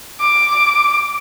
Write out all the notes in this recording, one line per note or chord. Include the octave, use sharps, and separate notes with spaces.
D6